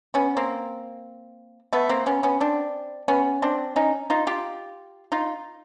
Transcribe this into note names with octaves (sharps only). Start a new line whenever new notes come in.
B3 C#4
A#3 C4
A3 B3
A#3 C4
B3 C#4
B3 C#4
C4 D4
B3 C#4
C4 D4
C#4 D#4
D#4 F4
F4 G4
D#4 F4